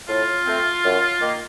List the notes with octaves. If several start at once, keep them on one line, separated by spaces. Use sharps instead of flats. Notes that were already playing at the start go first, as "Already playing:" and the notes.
A2 F4
A3 C4
F#2
D#3 A#3